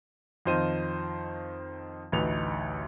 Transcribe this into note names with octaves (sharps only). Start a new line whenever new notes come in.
F2 D#3 F4 C5 D#5 D#7
A1 D2 D#4 B4 F7